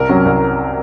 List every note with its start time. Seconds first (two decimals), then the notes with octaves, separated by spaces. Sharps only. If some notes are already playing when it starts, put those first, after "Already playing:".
Already playing: C2 A#4
0.09 C3 F#3 C#4
0.25 C2